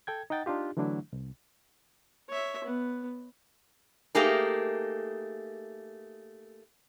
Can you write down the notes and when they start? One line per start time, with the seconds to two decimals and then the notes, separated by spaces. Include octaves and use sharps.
0.07 A4 G5 G#6
0.30 D#4 D#5 F#5 G5 A6
0.46 D4 D#4 F4 G4
0.77 D3 E3 F#3 A3 D4 E4
1.13 C2
2.29 C#5 E5
2.64 B3
4.15 A3 A#3 D#4 G4 G#4 A#4